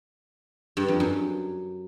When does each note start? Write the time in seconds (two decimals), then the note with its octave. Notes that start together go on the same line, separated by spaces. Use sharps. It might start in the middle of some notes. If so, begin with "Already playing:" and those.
0.77 G2
0.88 F2
1.00 F#2